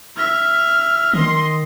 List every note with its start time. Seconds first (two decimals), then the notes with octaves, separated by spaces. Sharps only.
0.17 E5 F6
1.13 D#3 D#5 C6